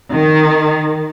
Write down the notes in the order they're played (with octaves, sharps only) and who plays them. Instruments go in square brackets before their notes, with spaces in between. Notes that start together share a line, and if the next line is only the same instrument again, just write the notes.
[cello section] D#3